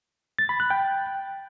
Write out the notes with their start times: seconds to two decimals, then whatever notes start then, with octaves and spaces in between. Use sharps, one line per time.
0.39 A6
0.49 B5
0.60 F#6
0.70 G5